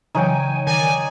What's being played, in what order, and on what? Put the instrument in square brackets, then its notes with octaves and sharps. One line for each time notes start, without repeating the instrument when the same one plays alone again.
[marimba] C#3 E3 F#3 [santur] D#4 C#5 G5 [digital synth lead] G#5
[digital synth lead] D#3 [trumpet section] D5 G#5